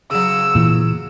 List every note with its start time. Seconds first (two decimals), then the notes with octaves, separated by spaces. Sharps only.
0.11 C#3 F#3 E6
0.55 A#2 E3